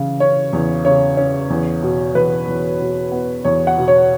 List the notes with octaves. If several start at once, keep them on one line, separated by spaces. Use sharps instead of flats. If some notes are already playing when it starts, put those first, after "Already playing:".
Already playing: C#3 E3
C#4 C#5
E2
C#3 C#5
C#4
E2
B2
E2 B4
E2
B2
B3
E2 C#5
F#5
B2
C#5